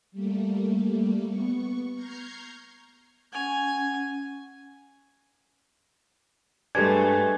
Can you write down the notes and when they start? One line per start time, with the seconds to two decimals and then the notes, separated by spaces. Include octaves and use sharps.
0.12 G3 A3 A#3
1.29 B3 C#6
1.94 A#5 C#6 F6 G6 G#6 C7
3.33 C#4 F#5 G#5
6.75 G2 G#3 A3 D4 G4 B4 G#5 G#6